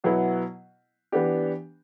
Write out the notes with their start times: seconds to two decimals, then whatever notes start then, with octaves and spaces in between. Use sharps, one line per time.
0.04 B2 F#3 B3 E4
1.12 E3 B3 D4 G4